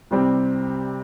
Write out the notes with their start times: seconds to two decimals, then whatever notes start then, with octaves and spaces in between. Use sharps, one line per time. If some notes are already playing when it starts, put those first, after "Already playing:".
0.11 C2 C3 G3 C4